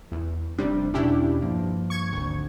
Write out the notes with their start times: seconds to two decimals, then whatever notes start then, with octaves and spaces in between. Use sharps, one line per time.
0.12 E2
0.59 F1 C3 G3 D4
0.94 E2 B2 C#4 D4 E4 G4
1.42 G2 F3 A#3
1.90 C#6 G#6
2.13 G#1 D2